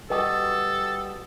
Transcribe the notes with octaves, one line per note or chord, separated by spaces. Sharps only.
G3 F#4 G4 A4 B4 D#5 D#6